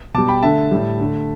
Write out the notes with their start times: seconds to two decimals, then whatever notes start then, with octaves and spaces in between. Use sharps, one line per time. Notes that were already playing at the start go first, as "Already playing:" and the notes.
0.14 B2 G3 A5 D6
0.28 G5 B5
0.43 D3 A3 E5 A5
0.71 A2 G3
1.00 D3 A3